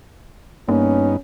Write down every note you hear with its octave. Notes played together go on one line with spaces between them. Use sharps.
G2 A#3 B3 C#4 D#4